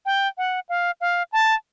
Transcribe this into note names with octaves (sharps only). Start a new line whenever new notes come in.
G5
F#5
F5
F5
A5